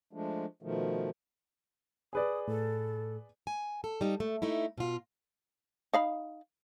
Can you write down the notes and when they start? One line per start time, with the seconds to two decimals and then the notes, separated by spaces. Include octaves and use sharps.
0.13 F3 G#3 A3 D4
0.62 B2 D#3 F3 A3
2.13 G#4 B4 D5 D#6
2.48 A2 A4
3.47 G#5
3.84 A4
4.01 G3 D#4
4.20 A3
4.42 A3 D#4 E4
4.78 B2 F4
5.93 D#4 F5 B5